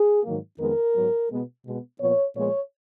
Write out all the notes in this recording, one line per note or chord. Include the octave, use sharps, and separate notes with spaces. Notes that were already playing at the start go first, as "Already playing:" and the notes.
Already playing: G#4
G#2 D#3 F#3 A#3
F2 D#3 G#3 B3 A#4
G#2 F#3 B3
B2 G#3 B3
B2 G#3 B3
A#2 F3 B3 C#5
A#2 F3 G#3 B3 C#5